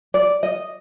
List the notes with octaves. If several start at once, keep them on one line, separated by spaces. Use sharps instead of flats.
D5
D#5